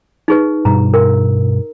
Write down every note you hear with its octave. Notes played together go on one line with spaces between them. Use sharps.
D#4 G#4 B4
G2 B2 G3 A#5
A#4